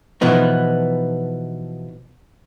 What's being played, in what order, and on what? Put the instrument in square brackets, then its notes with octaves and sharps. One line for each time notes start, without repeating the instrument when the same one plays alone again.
[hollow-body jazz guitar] B2 E3 F3 B3 D#4